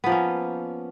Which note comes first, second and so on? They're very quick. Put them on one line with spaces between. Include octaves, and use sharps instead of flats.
B3 F3 A#3 C#4